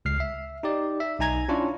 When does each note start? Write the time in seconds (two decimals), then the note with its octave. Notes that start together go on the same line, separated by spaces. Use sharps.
0.05 C#2 F6 C7
0.20 E5
0.63 D#4 G4 D5
1.00 E5
1.19 B1 D#4 G#5 A#5 G#6
1.48 C#4 D4 E4 F4 C#5